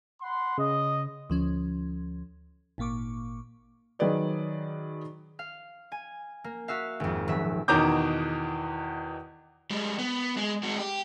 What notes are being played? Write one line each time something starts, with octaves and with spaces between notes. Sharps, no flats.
F#5 B5 C6
C#3 D#5
D2 F3 C#4
G#1 A#2 A#3 C#6 D6
D#3 F#3 G#4 B4 D5 D#5
F5
G#5
A#3
F#4 E5 F5
G#1 F2
D#1 F#3 E5
E2 B2 D#3 A#5 D6 G6
G3 G#3
B3
G#3
G#3 F#4
G4